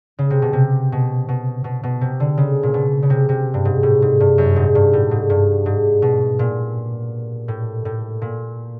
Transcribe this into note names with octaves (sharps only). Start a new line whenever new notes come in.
C#3
C3
B2
C3
B2
B2
B2
B2
C3
D3
C#3
A#2
B2
C#3
C3
C3
G2
G#2
A2
G#2
G2
F#2
G#2
G2
A2
G#2
G2
G#2
B2
A#2
A2
A2
A#2